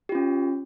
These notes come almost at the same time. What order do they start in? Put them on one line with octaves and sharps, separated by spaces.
G4 F4 C#4